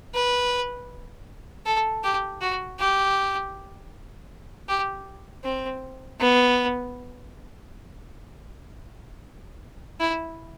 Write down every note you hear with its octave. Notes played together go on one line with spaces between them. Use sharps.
B4
A4
G4
F#4
G4
G4
C4
B3
E4